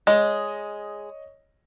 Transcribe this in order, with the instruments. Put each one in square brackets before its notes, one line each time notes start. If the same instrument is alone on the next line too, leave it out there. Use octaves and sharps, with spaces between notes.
[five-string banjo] G#3 [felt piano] C#5 D#5 D#6